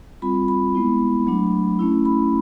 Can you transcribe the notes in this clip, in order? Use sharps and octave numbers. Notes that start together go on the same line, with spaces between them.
G3 C4 F4 B5
B5
G#3 B3 E4
F#3 A3 D4
A3 C#4 E4
B5